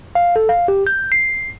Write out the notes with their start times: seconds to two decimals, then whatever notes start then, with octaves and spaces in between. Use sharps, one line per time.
0.15 F5
0.36 A4
0.49 F5
0.68 G4
0.87 G6
1.12 C7